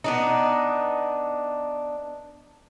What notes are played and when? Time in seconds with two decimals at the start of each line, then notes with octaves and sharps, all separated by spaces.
0.04 B3 D4 D#4